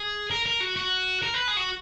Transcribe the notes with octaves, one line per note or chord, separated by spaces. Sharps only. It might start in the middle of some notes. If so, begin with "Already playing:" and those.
Already playing: G#4
A#4
A#4
F#4
F#4
A#4
B4
G#4
F#4